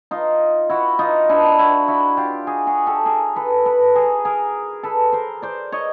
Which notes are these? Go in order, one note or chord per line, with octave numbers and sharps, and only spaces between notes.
D#4 F4
E4 F#4
D#4 F4
D4 E4
E4 F#4
E4 F#4
F4 G4
F#4 G#4
F#4 G#4
G4 A4
G#4 A#4
A4 B4
A4 B4
G#4 A#4
G#4 A#4
A4 B4
A#4 C5
C5 D5
C#5 D#5